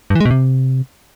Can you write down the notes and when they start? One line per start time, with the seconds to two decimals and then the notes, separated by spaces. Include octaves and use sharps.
0.10 G2
0.15 E3
0.20 G#3
0.25 B2
0.31 C3